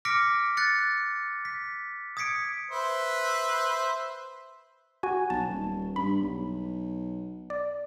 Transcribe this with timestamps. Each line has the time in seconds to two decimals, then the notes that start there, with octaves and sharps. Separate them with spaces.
0.05 D6 F6 A#6 B6 C#7 D7
0.57 F#6 A6 C#7
1.45 B6
2.17 D#6 G#6 B6 C#7 D7
2.71 B4 C5 E5
5.03 F#4 G#5
5.30 B1 A5
5.48 D#1
5.96 G2 B5
6.21 B1
7.50 D5